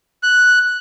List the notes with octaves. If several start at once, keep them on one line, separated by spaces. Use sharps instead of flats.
F#6